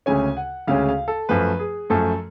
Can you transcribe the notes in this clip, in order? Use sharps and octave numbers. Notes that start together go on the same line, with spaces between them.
D2 C#3 G#3 C#4 G#5
F#5
D2 C#3 G#3 C#4 F5
F5
A4
F#2 F3 A3 B4
G#4
F#2 F3 A3 A4